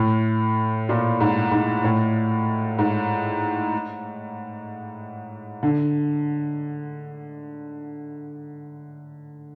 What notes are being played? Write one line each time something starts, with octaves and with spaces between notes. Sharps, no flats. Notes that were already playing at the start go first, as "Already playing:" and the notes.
Already playing: A2
A#2
G#2
G#2
A2
G#2
D3